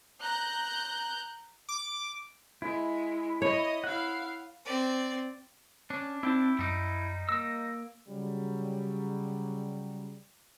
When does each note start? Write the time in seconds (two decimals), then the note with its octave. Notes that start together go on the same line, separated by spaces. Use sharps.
0.21 A#5 F#6 G6
1.69 D6
2.62 G#3 E4
3.42 C#5 D#5
3.84 E4 F5 F#5
4.65 C4 D5
5.90 C#4 D4
6.23 C4 D#4 E4 G5 A5
6.59 F#2 G3 D#4
7.29 A#3 E6 A#6
8.07 C#3 F#3 G3